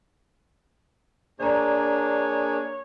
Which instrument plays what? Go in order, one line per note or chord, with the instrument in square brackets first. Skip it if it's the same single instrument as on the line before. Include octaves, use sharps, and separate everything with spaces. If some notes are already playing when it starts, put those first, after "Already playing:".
[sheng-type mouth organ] A#3 D4 G#4 [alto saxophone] C#5 [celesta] D5 A#5